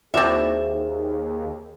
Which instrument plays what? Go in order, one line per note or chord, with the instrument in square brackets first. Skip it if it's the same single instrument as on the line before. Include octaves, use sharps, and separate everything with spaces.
[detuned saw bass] D#2 [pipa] C4 E5 [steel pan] E4 F#4 D5 [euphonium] G#4